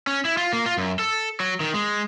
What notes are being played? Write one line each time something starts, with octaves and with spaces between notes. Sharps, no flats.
C#4
E4
F4
A#3
F4
F#2
A4
F#3
D#3
G#3